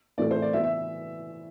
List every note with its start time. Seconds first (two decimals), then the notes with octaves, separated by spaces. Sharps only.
0.18 A2 E3 A3 C4 D5
0.31 C5
0.42 D5
0.53 E3 B3 E5
0.64 E5